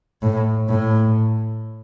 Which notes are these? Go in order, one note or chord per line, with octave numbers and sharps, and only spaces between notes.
A2
A2